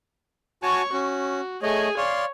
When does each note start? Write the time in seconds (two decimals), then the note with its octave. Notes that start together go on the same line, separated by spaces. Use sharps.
0.63 F#4 C#5 G#5 A5 C#6
0.93 C#4 F#4
1.63 A3 G#4 C#5 D#5 G#5
1.97 C#5 D5 F5 C6